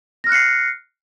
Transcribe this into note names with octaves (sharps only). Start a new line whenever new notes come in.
F6 F#6 A#6 C7 C#7